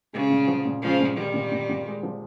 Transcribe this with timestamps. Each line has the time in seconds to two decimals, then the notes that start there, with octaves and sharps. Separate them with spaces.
0.13 C#3 G#3
0.30 A#2
0.48 F3
0.65 A#2
0.82 C#3 F3 G#3
1.00 A#2
1.17 D#3 F3 G3
1.34 A#2
1.51 A#2
1.69 A#2
1.86 G#3
2.03 F3